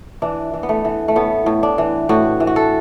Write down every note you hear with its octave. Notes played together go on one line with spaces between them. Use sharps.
E3 D4
E3
B3
A3
E3
A3
A2 B3
A2
D4
E3
A2 F#4
E3
F#4
A4